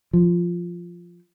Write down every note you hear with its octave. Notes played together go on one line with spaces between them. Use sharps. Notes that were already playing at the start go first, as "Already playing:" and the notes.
F3